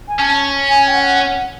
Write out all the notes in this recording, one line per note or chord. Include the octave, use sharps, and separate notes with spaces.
G#5
C#4 A5
G#5
G5
F#5